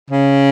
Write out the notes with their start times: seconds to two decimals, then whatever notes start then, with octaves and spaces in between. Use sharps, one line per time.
0.10 C#3